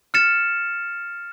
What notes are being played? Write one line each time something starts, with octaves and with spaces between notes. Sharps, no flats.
F6 A6 C#7 E7